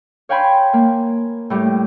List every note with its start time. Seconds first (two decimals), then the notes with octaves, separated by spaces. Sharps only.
0.29 C#5 F5 G5 G#5 B5 C6
0.74 A#3
1.50 A2 G3 G4